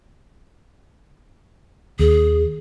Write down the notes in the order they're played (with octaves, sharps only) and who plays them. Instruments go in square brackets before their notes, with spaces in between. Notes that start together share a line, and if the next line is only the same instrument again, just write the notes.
[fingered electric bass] D#2 [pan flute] G#4